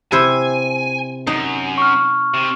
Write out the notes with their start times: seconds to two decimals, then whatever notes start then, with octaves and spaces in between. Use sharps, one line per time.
0.12 C3 E4 C5 G#5
1.27 F#2 D#4
1.78 C#6 F6
2.34 C3